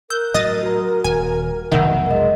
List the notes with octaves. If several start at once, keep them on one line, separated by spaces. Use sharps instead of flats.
A#4 E6 F#6 G6
A2 F#3 D#5 D#6 A6
F#4 A#5
D#1 G#5
F1 B1 B2 D#3 E5 F#5 E6
G#3 A#4 D#5